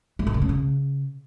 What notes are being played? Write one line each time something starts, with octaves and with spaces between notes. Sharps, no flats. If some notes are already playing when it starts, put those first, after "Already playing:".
A3
D#3
C#3
C#4
C#3